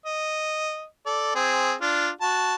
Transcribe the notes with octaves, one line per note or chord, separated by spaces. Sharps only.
D#5
A4 D5
C4 G#4
D4 F4
F#4 A5